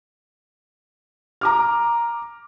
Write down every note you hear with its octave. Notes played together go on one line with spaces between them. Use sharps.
A#5 D6 F6